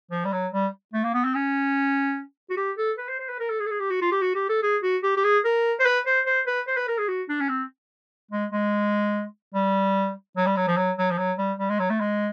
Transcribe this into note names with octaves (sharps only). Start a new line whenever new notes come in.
F3
G3
F#3
G3
A3
A#3
B3
C4
C#4
F#4
G4
A4
B4
C5
C5
B4
A#4
A4
G#4
A4
G#4
G4
F#4
F4
G4
F#4
G4
A4
G#4
F#4
G4
G4
G#4
A#4
C5
B4
C5
C5
B4
C5
B4
A#4
G#4
F#4
D4
C#4
C4
G#3
G#3
G3
F#3
G3
F#3
F3
F#3
F#3
F3
F#3
G3
G3
G#3
F#3
A3
G#3